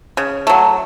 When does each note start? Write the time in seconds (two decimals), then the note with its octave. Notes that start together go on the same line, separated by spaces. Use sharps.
0.17 C#3
0.47 F#3 A3